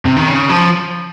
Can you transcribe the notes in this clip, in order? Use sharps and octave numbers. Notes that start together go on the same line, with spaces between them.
C3
D#3
C#3
F3